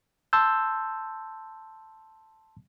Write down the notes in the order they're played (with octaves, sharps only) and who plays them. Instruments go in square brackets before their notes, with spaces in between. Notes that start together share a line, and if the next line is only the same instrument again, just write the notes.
[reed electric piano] A5 C6 E6 G6